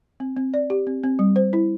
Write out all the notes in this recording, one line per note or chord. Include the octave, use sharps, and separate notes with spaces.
C4
C4
D5
G4
C4
C4
G3
C5
E4